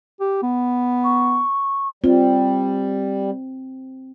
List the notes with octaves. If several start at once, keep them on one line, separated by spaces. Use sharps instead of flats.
G4
B3
C#6
G3 C4 F4